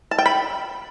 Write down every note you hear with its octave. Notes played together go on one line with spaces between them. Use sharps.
A5
G5
B5